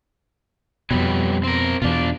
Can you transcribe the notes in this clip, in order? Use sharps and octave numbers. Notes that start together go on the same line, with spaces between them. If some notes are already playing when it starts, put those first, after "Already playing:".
F2 B2 F#3 G3 B3
C4 A#4
E2 B2 D4 F4